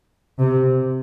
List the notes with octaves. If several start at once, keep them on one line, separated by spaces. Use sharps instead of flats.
C3